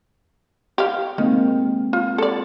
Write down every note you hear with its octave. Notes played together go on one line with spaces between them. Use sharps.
G4 F5
D#3 G#3 A#3 C4
F4
A4 D5